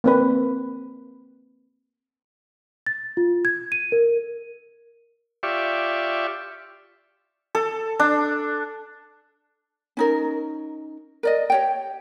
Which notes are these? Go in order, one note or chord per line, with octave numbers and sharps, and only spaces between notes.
A#3 C4 B4
A6
F4
G#6
D#7
A#4
F4 G4 D5 E5 C#6
A4
D4
C#4 D#4 A#4
A#4 D5 D#5
G4 C#5 G5